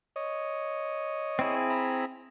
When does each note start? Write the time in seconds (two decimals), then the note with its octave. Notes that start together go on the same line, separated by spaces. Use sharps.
0.16 C#5 D#5
1.39 C4 E4 G#4
1.70 E5 A#5 B5